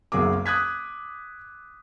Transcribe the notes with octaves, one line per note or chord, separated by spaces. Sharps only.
F#1 B1 F#3 G#4 A#4 D6
D#6 F#6 G#6 B6